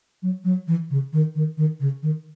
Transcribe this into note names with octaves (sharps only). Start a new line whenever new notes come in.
F#3
F#3
E3
C#3
D#3
D#3
D#3
C#3
D#3